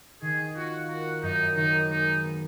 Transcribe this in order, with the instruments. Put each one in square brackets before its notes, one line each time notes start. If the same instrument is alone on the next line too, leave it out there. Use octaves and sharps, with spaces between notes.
[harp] D#3 [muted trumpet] G#4
[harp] F4 [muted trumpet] F#4
[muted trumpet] F#4 [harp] A#4
[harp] F#2 [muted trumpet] D#4
[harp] D#3 [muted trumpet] D#4
[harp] G#3 [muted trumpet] D#4
[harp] B3